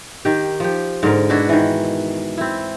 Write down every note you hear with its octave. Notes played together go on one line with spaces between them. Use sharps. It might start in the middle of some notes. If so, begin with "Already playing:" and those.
D#3 G4
F3 G4
G#2 D3 A#4
B2 D4 E4 F#4
D#3 E3
C4 E4